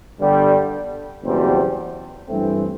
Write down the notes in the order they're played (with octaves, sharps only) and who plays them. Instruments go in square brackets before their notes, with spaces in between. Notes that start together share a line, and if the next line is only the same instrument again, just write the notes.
[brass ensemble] G1 G2 D3 G3
F#1 E2 B2 G3 C4
G2 E3 A3 C4